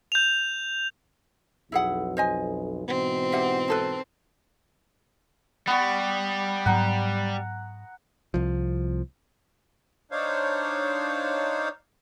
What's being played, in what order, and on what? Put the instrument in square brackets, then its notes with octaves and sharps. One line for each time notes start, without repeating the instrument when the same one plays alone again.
[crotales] G6 F7
[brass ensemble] B1 F2 [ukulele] E4 G#4 F#5
[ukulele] C5 D#5 G#5
[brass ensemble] G#2 B2 E3 [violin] C4
[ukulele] G4 E5 F#5
D#4 A4 B4
[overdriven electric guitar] G3 [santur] B3 C#6
[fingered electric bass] G#2 F#3 B3 [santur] F#5 A#5
[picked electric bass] C2 F3
[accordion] D4 D#4 C5 C#5 F5